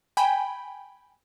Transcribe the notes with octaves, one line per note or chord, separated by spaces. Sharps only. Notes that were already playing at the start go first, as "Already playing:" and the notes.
G5 G#5 B5